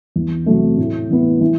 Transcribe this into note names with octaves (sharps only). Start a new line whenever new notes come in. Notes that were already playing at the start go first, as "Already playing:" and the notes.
E2
C3 F#3 A3
A2
E3 B3 E4
E3